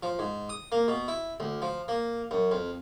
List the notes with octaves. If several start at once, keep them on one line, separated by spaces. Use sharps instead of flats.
F3
G#2
D#6
A#3
B2
E4
D2
F3
A#3
F#2
F2